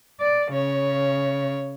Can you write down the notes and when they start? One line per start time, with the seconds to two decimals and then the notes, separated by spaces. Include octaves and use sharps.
0.21 D5
0.53 C#3 C#5